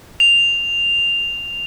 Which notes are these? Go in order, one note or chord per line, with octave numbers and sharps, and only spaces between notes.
F7